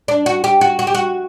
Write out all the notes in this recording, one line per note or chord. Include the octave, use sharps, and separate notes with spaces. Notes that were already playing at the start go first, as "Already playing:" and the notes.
D4
F#4
G4
F#4
F#4
G4
F#4